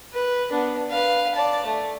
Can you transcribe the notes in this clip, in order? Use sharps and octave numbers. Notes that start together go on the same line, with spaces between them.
B4
B3 D4
B4 F5
D5 A5
A3